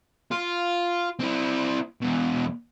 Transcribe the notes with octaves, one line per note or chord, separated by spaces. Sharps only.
F4
C4 E4
E2 B2